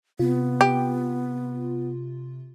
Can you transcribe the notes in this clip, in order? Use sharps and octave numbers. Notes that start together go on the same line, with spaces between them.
C3 B3 F4
G4